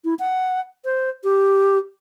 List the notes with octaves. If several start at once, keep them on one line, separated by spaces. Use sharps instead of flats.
E4
F#5
C5
G4